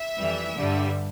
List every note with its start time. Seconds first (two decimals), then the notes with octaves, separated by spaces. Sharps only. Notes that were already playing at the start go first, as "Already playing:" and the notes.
Already playing: E5
0.16 F2 E3 G3
0.55 G2 D3 G3